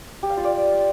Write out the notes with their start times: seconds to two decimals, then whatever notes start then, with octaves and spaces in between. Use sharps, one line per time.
0.23 G4
0.30 F5
0.37 F4
0.44 D5